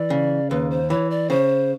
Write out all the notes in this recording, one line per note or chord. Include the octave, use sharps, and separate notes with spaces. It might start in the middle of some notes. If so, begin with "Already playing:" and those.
Already playing: E3 D5
C#3
D#2 B4
C5
E3 C#5
D5
C#3 C5